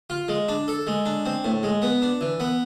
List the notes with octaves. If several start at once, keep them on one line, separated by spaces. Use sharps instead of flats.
F4
G#3
D4
A4
G#3
D4
C4
A2
G#3
B3
D4
E3
B3